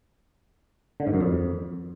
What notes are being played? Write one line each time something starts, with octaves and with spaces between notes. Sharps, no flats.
D3
G#2
F#2
F2